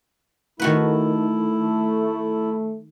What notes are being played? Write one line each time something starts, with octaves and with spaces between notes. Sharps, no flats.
D#3 A3 E4 F#4 B4